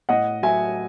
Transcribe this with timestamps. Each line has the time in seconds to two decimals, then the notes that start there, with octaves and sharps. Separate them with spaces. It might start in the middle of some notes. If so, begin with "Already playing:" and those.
0.09 A2 D#5 F#5
0.42 F#3 A3 E5 G#5